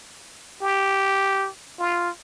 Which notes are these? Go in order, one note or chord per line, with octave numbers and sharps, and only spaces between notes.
G4
F4